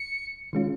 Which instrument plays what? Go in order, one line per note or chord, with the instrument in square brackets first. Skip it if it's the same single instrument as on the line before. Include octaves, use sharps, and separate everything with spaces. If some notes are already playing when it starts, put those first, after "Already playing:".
Already playing: [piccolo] C#7
[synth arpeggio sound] D#3 G#3 C#4 F4